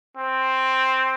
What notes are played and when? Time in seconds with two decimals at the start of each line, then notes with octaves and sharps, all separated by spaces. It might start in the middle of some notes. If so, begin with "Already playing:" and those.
0.17 C4